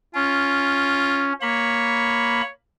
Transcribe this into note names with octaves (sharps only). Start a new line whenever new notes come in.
C#4 F4
A#3 C#5 B5